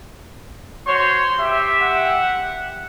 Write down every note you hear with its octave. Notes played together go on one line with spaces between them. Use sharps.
F#4 C5 C#5 C6
G4 E5
F#5